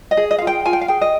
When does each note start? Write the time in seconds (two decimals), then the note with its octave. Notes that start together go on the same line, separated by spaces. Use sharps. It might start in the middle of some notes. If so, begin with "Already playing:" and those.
0.11 D#5
0.17 G#4
0.31 D#5
0.38 F5
0.42 F4
0.47 G5
0.65 F4 G#5
0.73 G5
0.81 F5
0.88 G#4 G5
1.01 D#5